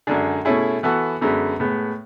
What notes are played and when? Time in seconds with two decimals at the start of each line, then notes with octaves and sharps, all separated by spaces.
0.07 F#2 D3 G#3 D4 G#4
0.45 B2 A3 C#4 E4 G#4
0.83 E3 B3 F#4 A4
1.21 F#2 D3 G#3 B3
1.60 A2 G#3 B3